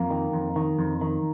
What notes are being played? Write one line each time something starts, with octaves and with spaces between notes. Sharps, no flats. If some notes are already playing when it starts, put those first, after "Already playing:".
Already playing: F2 A#3
D#3
F2
D#3
F2
D#3